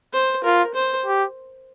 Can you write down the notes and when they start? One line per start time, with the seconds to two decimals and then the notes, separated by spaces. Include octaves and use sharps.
0.13 C5
0.44 F4 A#4
0.75 C5
1.06 G4